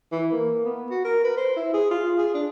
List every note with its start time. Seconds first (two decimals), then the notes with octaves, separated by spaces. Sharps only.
0.12 E3
0.32 A#3
0.65 B3
0.91 F#4
1.05 A#4
1.24 B4
1.37 C5
1.56 E4
1.73 G#4
1.91 F4
2.18 G#4
2.34 D4